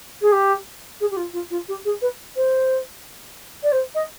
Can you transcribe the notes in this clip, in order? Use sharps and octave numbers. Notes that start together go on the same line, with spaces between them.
G#4
G4
G#4
G4
F4
F4
F4
G4
G#4
B4
C5
D5
C5
D#5